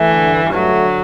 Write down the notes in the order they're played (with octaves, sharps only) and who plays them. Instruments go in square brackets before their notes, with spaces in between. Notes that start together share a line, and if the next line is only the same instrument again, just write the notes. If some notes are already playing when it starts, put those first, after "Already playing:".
Already playing: [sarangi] E3 [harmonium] A3
[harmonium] D3
G2
G2
[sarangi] F#3 [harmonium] A3
[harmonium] D3